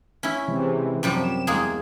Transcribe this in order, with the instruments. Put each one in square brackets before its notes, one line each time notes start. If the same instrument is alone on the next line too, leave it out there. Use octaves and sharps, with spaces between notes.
[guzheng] C#4 E4
[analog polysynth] C3 E3 G#3
[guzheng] F#2 C3 G3 [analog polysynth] F3
[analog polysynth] E7
[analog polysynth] E2 [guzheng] G#3 A#3 G#4